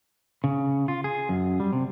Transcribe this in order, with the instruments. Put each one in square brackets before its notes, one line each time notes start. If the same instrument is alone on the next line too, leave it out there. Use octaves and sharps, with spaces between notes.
[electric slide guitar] C#3
F4
G#4
F#2
G3
C3